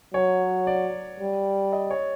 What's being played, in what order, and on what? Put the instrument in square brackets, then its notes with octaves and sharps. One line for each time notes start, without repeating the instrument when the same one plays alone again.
[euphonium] F#3 [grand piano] C#5
[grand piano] D5
[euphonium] G3
[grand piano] D#5
C#5